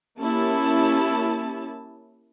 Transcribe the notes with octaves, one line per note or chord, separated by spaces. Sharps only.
A#3 C#4 E4 G4 A5